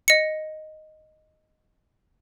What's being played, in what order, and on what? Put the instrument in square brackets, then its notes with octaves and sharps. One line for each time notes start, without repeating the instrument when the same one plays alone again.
[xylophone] D#5 C#7